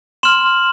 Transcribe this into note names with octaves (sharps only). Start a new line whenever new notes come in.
C6 F6 E7 F#7